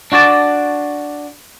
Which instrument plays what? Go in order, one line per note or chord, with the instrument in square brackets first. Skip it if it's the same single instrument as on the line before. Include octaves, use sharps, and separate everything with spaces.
[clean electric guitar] D4 F#4 D5 A5